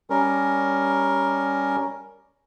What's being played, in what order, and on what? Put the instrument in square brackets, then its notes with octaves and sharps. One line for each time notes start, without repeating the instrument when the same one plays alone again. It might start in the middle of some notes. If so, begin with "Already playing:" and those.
[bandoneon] G3 C#4 A#4